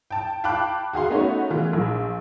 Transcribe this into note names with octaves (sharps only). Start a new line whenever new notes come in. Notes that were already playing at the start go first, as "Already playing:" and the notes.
G5 A5
F5 G5 A5 B5 D6 F#6
F#4 G#4 F5 C6
A3 B3 C#4 D#4 F#4 C#5
E3 A3 F4
A#1